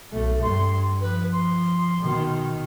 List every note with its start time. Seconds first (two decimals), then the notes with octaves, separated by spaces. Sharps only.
0.13 B1 A3
0.43 G2 C6
1.01 F3 B4
1.33 C6
2.02 B2 D#3